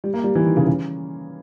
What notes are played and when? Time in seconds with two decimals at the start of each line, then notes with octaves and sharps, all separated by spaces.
0.04 G3
0.14 A#3
0.24 G3
0.35 E3
0.45 D#3
0.57 C#3
0.67 C#3